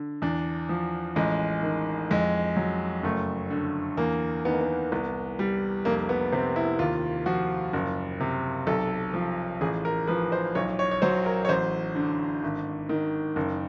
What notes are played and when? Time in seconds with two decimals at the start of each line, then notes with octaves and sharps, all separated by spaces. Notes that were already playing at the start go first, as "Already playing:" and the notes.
Already playing: D3
0.22 E2 D4
0.69 F3
1.16 A1 G#3
1.63 D#3
2.11 F2 G#3
2.57 F#3
3.03 F#1 A3
3.51 D3
3.97 E2 A#3
4.45 D#3 B3
4.54 A#3
4.61 B3
4.92 C2 B3
5.39 G3
5.85 F1 A#3
6.09 B3
6.32 C3 C4
6.56 E4
6.79 D#2 F4
7.26 F3 F#4
7.73 F#1
8.20 C3
8.67 B1 A4
9.14 F3
9.61 A1 G#4
9.85 A#4
10.07 F3 B4
10.32 C5
10.55 B1 C#5
10.79 C#5
10.91 C#5
11.02 F#3 C5
11.26 A#4
11.45 C#5
11.49 A1 C5
11.95 D3
12.43 G#1
12.89 D#3
13.36 F#1